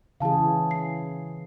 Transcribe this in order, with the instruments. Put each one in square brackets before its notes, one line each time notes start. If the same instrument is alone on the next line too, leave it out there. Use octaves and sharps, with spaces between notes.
[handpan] C#3 E3 G#4 [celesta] F5 A5
[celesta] C7